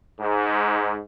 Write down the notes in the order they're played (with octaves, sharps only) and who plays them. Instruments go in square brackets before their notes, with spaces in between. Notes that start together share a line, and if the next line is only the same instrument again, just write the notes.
[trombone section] G#2